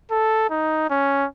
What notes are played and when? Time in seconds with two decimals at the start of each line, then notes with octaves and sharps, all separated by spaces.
0.11 A4
0.50 D#4
0.90 C#4